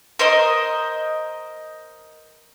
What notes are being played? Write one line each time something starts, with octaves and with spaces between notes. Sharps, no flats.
A#4 C5 D#5 C6